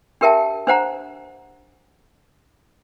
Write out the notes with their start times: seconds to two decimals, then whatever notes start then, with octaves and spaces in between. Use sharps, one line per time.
0.21 D4 G4 A#4 E5 G5 A5
0.67 D4 C5 F#5 A#5